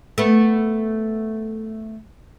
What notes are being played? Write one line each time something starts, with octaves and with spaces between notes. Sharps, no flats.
A3 B3